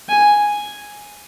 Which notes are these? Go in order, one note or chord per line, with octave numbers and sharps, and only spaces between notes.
G#5